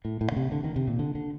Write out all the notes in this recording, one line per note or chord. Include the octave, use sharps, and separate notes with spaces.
A2
A2
D3
C3
D3
D#3
C3
A#2
D3
D3